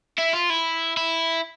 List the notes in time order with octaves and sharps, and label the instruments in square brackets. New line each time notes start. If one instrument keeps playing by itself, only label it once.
[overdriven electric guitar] E4
F4
E4
E4